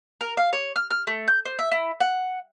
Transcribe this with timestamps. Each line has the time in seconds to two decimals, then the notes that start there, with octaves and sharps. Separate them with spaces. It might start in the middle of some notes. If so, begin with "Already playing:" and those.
0.21 A#4
0.37 F5
0.53 C#5
0.76 F6
0.91 F6
1.07 A3
1.28 G6
1.45 C5
1.59 E5
1.71 E4
2.00 F#5